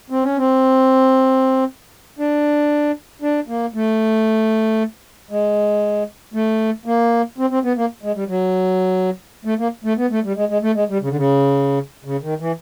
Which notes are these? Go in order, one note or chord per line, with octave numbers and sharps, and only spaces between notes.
C4
C#4
C4
D4
D4
A#3
A3
G#3
A3
A#3
C4
C4
B3
A#3
G#3
G3
F#3
A3
A#3
A3
B3
A3
G3
G#3
G#3
A3
G#3
G3
C#3
D3
C#3
C#3
D#3
E3